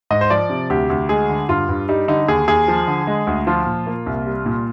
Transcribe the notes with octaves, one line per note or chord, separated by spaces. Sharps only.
G#2 D#5
C5
F3 D5
C3
D2 G4
D2
G#3 G#4
D3
G2 F4
G2
G3 D#4
D3 D#4
D#2 G#4
D#2 G#4
F3
D3
G#3
D2
F3 F4
A#2
A#3
C2
G3
A#2